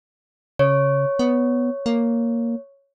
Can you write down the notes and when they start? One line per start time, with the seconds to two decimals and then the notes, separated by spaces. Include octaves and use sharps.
0.59 C#3 C#5
1.19 B3
1.86 A#3